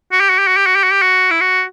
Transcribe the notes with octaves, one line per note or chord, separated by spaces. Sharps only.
F#4
G4
F#4
G4
F#4
G4
F#4
G4
F#4
G4
F#4
E4
F#4